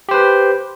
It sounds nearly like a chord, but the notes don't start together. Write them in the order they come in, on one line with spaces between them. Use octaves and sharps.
G4 C5 B4